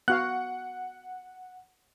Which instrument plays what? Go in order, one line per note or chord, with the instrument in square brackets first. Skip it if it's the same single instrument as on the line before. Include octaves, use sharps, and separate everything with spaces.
[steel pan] B3 F#4 F5 [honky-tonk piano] F#5 [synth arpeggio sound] F#6